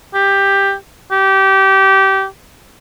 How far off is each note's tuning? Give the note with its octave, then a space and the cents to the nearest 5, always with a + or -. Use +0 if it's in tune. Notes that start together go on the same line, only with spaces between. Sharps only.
G4 +10
G4 -20